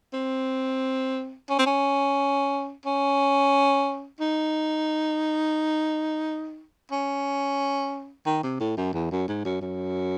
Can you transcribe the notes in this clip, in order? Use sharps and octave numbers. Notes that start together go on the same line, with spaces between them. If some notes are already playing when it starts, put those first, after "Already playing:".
C4
C#4
C4
C#4
C#4
D#4
C#4
D#3
C3
A2
F#2
E2
F#2
G#2
F#2
F#2